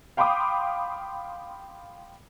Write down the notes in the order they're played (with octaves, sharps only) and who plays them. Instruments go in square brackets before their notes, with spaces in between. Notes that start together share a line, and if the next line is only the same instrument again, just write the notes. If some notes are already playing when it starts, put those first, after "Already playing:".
[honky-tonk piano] F5 G5 B5 C6 D6 D#6